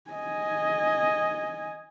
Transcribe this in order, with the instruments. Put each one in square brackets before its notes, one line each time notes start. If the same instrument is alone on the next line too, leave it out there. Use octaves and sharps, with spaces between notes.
[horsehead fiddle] D#5 G#5